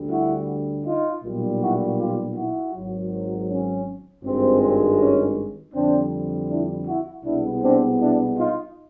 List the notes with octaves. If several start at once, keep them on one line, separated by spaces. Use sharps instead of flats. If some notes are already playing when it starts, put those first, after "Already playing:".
Already playing: D2 D3 G3
E4 F#4
D#4 F4
B1 A#2 G3
E4 F#4
F4 G4
E4 F#4
G#1 G#2 D#3 F#3
C#4
G#1 G2 D#3 G#3 C4
C4
C#4
F2 D3 G3 C4 D4
D4 E4
E4 F#4
C2 B2 G#3 B3 D4 E4
C4 D4
D4 E4
D#4 F4